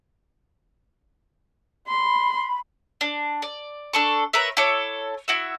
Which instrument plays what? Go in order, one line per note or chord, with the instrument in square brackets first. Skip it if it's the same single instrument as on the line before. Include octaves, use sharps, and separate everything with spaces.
[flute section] B5 [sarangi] C6
[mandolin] D4
D5
D4 A4 C#6
A#4 B4 C#5 E5
E4 A4 C#5 D6
E4 F#4 E5